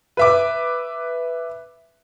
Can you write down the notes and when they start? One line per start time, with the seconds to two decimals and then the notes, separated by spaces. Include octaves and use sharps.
0.17 B4 E5 D6